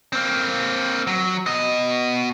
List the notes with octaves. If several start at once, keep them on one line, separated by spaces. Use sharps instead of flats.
A#3 C4
F#3
B2 D#5